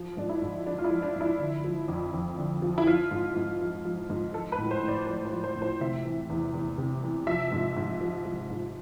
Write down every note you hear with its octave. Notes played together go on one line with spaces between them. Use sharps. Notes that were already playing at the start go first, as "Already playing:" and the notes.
Already playing: F3
G#2 D4
E4
G#2
F3 D4
F4
E4
F3
D4
G#2
E4
D3
F3
F2
F2
D3
F3
E4
F3 F4
G#2
G#2
F3
F3
G#2
F3 A4
B4
A2
C5
A2
D5
F3 C5
C5
F3
C5
A2
C5
C3 E5
E3
E2
E2
C3
E3
F3 E5
G#2
G#2
F3
F3
G#2